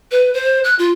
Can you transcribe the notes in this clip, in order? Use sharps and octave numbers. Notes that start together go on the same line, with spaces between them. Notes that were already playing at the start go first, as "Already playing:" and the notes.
B4
C5
F#6
F4